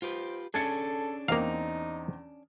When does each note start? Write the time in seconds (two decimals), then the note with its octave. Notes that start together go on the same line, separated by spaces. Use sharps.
0.02 F4 G4 B4 C5
0.54 C#4 D4 G#4 A4 G#6 A6 C#7
1.28 E2 A#3 C4 D#4 F5 F7